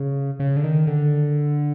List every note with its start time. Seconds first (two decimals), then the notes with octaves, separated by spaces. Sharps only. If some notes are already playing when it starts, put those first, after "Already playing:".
Already playing: C#3
0.40 C#3
0.57 D3
0.64 D#3
0.87 D3